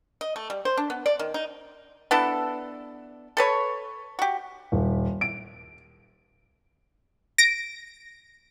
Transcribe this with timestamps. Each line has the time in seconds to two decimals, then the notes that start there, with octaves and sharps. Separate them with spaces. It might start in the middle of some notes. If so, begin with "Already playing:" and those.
0.21 D#5
0.36 A3
0.50 G3
0.65 C5
0.77 D4
0.90 B3
1.06 D5
1.19 D#3
1.34 D#4
2.11 B3 D4 E4 A4
3.37 A4 B4 C#5
4.19 F#4 G4
4.72 D#1
5.21 D7
7.38 A#6 D7